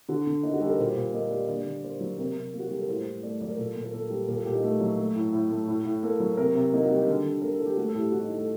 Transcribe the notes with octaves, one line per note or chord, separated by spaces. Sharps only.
D3 F#4
D3
A#3 D#4
F#4
G3 A4
A#4
A#2 C5
A#2
A#3 D#5
G3 D5
D3 D5
D3
A#3 C5
F#3
C3 A#4
C3
A#3
F#4
G4
G3 A4
A#4
A2 C5
A2
A3 D5
F#3 D5
A#4
A#2 A4
A#2
A#4
A#3 A4
G3
A#2 A#4
A4
A#2 G4
D#4
A3
F#3
A3
A2
A2
A3
A2
A2
A#3 A4
F#3
C3 A#4
C3
A#3 D#4
G3 F#4
G4
D3 A4
D3
A#3 A#4
A4
G3
G4
A3 F#4
A4
A2 G4
A2 F#4
D#4
A3
A4